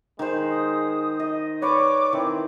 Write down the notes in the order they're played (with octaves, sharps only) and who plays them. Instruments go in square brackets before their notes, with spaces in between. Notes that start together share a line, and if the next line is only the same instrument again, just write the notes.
[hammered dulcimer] D#3 C5 [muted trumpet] G#3
[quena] D#6
[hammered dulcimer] D#5
[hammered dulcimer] B4 D5 [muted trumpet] C#5 [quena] D6
[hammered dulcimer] D#3 E3 [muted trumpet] C4